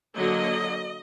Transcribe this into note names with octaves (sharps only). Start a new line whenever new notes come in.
D3 F#3 A#3 D#5